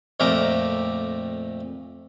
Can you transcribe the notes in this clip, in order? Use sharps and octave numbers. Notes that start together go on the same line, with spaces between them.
F2 A#2 A3 G4 A#4 D6